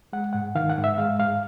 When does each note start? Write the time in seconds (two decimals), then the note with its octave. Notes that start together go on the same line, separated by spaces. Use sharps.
0.13 G#3 F#5
0.33 G#2 F#5
0.55 D#3 F5
0.70 F#5
0.77 G#2
0.84 E5
0.98 G#3 F5
1.19 G#2 F5